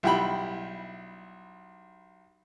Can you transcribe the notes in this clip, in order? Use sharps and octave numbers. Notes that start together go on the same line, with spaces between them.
B1 G3 E4 G5 B5